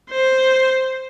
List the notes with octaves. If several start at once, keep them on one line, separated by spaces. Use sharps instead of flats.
C5